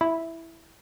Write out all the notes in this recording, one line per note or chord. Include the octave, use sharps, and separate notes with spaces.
E4